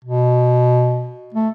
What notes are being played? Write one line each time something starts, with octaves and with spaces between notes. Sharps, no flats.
B2
A3